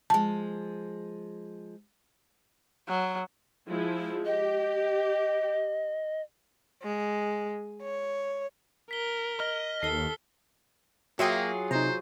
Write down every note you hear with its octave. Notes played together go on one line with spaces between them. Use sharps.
F3 G#3 A5
F#3
F3 G#3 E4
G4 D#5
G#3
C#5
A#4 B6 G7
D#5 F6
D#2 A4 C7 G7
F#3 A#3 F4 F#4 G#4 E5 G5
C3 D#4 C5 A#5